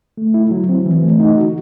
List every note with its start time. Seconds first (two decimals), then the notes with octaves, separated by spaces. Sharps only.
0.17 A3
0.34 E4
0.51 F#3
0.69 C4
0.86 E3
1.03 A3
1.20 D#4
1.37 F#4